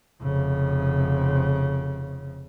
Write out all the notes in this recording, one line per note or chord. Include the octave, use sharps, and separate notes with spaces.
F1 C#3